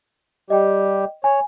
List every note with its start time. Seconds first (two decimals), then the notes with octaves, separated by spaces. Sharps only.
0.50 G3 G4 D#5 G5
1.24 C#5 G#5